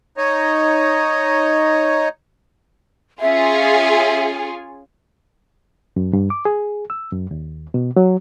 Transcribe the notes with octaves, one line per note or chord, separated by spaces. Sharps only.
D#4 C#5 D#5
C#4 F4 G#4 E5
F#2
G2
D6
G#4
E6
F#2
D#2
B2
F#3